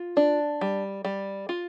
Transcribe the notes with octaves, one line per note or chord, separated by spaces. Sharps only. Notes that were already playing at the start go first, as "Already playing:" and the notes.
Already playing: F4
D4
G3
G3
F4